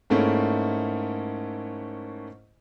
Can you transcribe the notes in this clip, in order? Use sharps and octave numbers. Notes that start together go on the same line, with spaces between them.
G#2 A3 A#3 C#4 E4